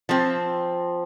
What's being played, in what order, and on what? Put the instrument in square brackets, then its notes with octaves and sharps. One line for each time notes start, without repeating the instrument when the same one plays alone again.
[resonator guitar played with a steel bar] F3 C4